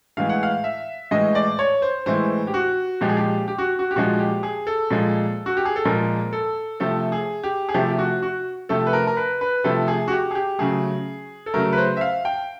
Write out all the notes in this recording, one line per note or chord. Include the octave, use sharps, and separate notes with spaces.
A2 E3 G#3 F5
F#5
F5
E5
A2 E3 G#3 D#5
D5
C#5
C5
A2 E3 G#3 C5
G4
F#4
A#2 F3 G#3 G4
G#4
G4
G4
F#4
F#4
G4
A#2 F3 G#3 F#4
G4
G#4
A4
A#2 F3 G#3
F#4
G4
G#4
A4
A#2 F3 G#3 A#4
A4
C3 F3 A3 A4
G#4
G4
G#4
C3 F3 A3 G4
G4
F#4
F#4
C3 F3 A3 A4
B4
A#4
A#4
B4
B4
C3 F3 A3 A4
G#4
F#4
G4
G#4
G4
C#3 F#3 A3 G#4
A4
C#3 F#3 A3 A#4
B4
C5
E5
F5
G5